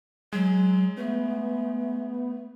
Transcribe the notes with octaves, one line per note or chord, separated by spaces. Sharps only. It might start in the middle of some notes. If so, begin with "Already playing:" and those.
F#3 G#3
A3 B3